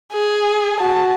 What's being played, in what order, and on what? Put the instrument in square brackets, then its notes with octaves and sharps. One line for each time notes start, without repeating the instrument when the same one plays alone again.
[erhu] G#4
[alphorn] F#4 [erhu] A5